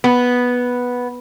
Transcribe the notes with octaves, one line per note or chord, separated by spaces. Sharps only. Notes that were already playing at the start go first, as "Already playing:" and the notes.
B3